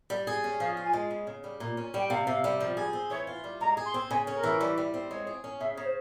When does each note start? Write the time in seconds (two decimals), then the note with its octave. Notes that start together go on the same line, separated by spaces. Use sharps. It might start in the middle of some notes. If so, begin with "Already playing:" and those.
0.10 G3
0.27 G#4
0.44 C#4
0.60 F3 F5
0.77 F4
0.85 G#5
0.93 G#3
1.11 C#3
1.27 C#3
1.44 G3
1.60 A#2
1.77 C#4
1.94 G3
1.99 G5
2.10 C3 F5
2.27 C3
2.44 G3
2.60 F3
2.77 G#4
2.93 C4
3.10 E3 C#5
3.27 F4
3.44 G3
3.61 G#3 A#5
3.77 G#4
3.86 C6
3.94 C4
4.10 C#3 G#5
4.27 C#4
4.35 A#4
4.44 E3
4.61 G3
4.78 G3
4.94 C4
5.11 G#3 C#5
5.27 G#4
5.44 C#4
5.60 C#3 E5
5.75 C#3 C#5
5.85 C5